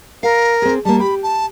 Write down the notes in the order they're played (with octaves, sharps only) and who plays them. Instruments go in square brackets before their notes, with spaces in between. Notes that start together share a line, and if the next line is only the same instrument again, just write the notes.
[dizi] A#4 [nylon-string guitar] F5
[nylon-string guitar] C4 G#4
[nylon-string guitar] G3 A#3 [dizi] A5
[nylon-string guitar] G4 [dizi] B5
[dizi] A5